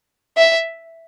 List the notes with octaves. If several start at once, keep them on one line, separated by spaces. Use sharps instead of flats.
E5